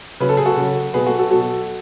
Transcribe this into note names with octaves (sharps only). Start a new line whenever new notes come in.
C#3 F#3 B4
A4
G#4
F#4 A4
C#3 F#3
B2 F#3 G#4 B4
F#4 A4
F#4 A4
B2 F#3 F#4 A4